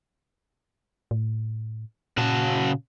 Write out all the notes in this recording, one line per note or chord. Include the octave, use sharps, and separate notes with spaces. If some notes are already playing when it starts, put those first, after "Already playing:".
A2
A#2 C#3 F#4 A5